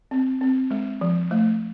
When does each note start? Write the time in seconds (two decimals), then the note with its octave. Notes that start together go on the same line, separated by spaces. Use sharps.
0.11 C4
0.41 C4
0.71 G#3
1.01 F3
1.31 A3